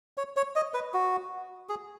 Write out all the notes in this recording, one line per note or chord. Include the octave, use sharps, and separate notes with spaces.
C#5
C#5
D#5
B4
F#4
G#4